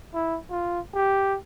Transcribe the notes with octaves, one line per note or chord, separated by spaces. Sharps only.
E4
F4
G4